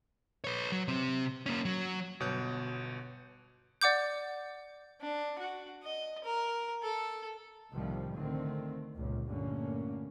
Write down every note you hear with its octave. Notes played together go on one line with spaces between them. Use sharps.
B4 C#5
F#3
C3 C4
A#3 C#4
F#3
G1 B2 C#5 F#6 G6
D5 F#5 D6 G6
D4
F#4
D#5
A#4
A4
C2 A2 C3 D#3 F3 G3
D3 D#3 A3 C4
G1 C#2 A#2
G2 A#2 D3 A3 A#3 C#4